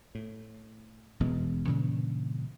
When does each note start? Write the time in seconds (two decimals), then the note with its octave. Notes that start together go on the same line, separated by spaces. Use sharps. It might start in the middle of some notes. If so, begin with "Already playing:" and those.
0.15 A2
1.20 E1 B2 E3 G#3
1.67 G2 A#2 C#3 E3